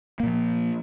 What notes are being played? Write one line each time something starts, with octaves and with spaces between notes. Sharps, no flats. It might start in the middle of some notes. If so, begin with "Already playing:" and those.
A#2 F3 A#3